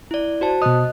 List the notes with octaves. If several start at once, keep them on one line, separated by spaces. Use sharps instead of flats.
E4 D5
F#4 C5 A5
B2 D#5 D#6 F#6